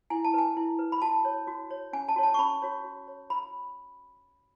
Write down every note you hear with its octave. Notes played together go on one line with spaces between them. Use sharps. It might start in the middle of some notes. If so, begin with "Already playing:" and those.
E4 G#5
A5
B4 G#5
E4
B4
B5
F#4 A5
C#5
F#4
C#5
C#4 G#5
A5
F#4 C#5
A5
C#6
C#4 B5
F#4 C#5
F#4
C#5
F#4 B5